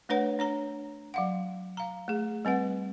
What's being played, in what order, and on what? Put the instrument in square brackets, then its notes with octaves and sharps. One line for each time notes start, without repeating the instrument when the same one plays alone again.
[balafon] A3 D4 B4 C#5 F#5
D4 C#5 A#5
F#3 F5 F#5
F5 A#5
A3 G#4
G3 C4 B4 F#5